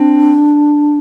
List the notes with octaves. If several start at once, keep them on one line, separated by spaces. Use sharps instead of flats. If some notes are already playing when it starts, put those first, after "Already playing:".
Already playing: C4 D4